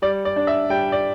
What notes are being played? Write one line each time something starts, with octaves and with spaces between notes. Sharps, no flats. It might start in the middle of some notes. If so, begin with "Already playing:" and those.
G3 D5
D5
D4
E5
G3 G5
D5